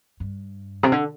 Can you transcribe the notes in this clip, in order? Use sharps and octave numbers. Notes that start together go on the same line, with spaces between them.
G2
C3
D3